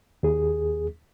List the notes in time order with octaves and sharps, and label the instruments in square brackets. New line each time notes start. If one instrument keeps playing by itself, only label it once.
[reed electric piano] D#2 G#4